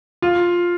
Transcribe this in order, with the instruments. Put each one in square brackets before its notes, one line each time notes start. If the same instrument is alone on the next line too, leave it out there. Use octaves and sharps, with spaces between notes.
[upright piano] F4